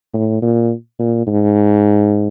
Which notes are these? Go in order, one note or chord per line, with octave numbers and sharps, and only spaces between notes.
A2
A#2
A#2
G#2